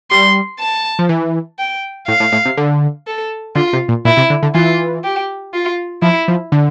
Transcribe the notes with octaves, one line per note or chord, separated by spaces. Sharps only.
G3 C6
A5
F3
E3
G5
A2 F5
A2
A2
C3
D3
A4
D3 F4
C3
A#2
A#2 E4
C3
D3
D3
E3 F4
G4
F4
F3 E4
F3
D3